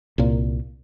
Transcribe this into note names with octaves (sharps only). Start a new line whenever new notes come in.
C2 A#2